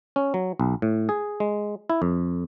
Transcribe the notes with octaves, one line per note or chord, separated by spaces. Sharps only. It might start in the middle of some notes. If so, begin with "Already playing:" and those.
C#4
F#3
B1
A2
G#4
G#3
E4
F2